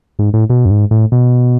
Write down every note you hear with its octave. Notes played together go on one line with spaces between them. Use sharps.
G#2
A2
B2
F#2
G#2
A2
B2